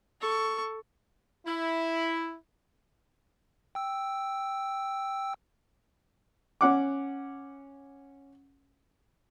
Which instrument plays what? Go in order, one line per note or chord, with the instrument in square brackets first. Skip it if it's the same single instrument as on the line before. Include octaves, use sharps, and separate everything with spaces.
[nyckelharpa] A4 C#6
[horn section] E4
[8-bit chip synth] G5 E6
[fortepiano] C#4 F#5 D6